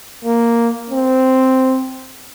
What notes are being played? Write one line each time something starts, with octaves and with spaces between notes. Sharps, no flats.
A#3
C4